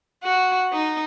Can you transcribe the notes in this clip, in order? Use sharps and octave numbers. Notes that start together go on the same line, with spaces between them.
F#4
D#4